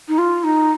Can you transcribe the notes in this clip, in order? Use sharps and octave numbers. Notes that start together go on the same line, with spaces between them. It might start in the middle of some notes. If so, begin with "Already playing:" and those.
D#4
F4
D#4